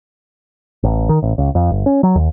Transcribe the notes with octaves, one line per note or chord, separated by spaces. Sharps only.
A1
D#3
A1
C#2
F2
G1
C#4
F#3
D#2